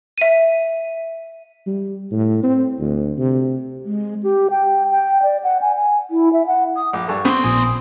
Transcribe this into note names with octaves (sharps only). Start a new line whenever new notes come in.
E5 D#7
G3
A2
C4
D2
C3
G#3
G4
G5
G5
D5
F#5
G#5
G#5
E4
E5
F#5
D#6
A#1 D6
G2 A4 C#6
B3 C4 C6
A#1 A#2 G#5 D#6